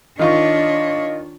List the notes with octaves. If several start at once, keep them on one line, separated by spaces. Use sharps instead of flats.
D#3 D4 F4 C#5 D#5 C#6